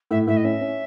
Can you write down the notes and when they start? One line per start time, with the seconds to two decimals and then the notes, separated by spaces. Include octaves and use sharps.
0.11 A2 E5
0.27 A2 E5
0.37 D#5
0.44 C#4 E5
0.61 C#4